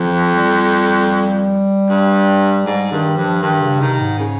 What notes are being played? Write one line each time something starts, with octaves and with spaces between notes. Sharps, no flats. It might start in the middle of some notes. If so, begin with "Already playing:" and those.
Already playing: F2 F3
G3
G2
G#2 G3
G2 D#3
G2 F3
G2 D#3
C#3
C3 D#3
G#2
C#3